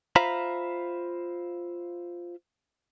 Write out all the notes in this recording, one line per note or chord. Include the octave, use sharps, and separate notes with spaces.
F4 C5 E5 F5 A#5 B5